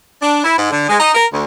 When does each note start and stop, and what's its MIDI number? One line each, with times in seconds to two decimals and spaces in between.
0.22 0.39 62
0.44 0.57 64
0.57 0.70 44
0.71 0.86 50
0.88 0.95 56
0.99 1.12 63
1.13 1.25 70
1.32 1.45 38